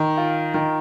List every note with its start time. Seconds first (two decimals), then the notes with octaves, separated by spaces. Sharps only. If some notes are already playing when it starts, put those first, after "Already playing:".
Already playing: D#3
0.17 F4
0.54 D#3